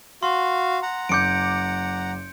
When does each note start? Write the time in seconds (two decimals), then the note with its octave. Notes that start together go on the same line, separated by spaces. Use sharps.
0.23 F#4 F5 C6
0.83 F#5 A#5
1.09 F#1 D6 G6 C#7 D7